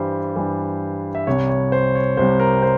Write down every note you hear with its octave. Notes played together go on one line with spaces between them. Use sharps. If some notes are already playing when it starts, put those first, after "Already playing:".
Already playing: G2 E3 G3 C5
G2 E3 G3
E5
C2 C3 G3 C#5
C#5
C5
C#5
C2 C3 G3 C5
A#4
C5